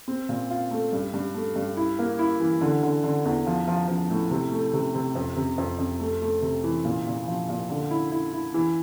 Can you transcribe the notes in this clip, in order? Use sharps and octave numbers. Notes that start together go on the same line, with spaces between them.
C4
A#2
F4
A3
G2
G2
A3
G2
E4
A#3
E4
E3
D3
D3
D3
E2
F3
F3
F3
A2
C3
A3
C3
C3
F2
C3
F2
F2
A3
A3
C3
E3
A#2
A#2
F3
A#2
D3
E4
E4
E4
E3